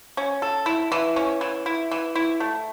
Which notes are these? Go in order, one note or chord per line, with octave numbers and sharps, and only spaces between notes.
C#4
A4
E4
E3
C#4
E3
E4
E3
E4
A3